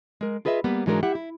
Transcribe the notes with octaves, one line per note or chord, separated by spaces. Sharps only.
G#3 A#4
F4 G#4 B4 D#5 E5
G3 A#3 B3 B4
G#2 E3 F#3 G#3 D4 A#4
E4 G4 E5 F#5
E4